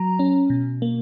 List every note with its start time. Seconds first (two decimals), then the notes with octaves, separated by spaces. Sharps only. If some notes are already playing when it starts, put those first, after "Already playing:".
Already playing: F#3 A#5
0.19 C#4
0.50 B2
0.82 A#3